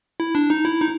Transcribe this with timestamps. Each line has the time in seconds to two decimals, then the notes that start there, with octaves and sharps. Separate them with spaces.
0.20 E4
0.35 D4
0.50 D#4
0.65 E4
0.81 D#4